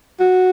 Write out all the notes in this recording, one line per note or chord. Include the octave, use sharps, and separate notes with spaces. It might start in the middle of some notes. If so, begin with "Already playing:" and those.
F#4